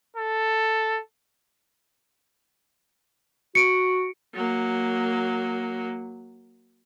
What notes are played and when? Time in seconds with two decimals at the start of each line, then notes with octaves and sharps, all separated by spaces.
0.16 A4
3.55 F#4 C#7 D7
4.34 F#3 A#3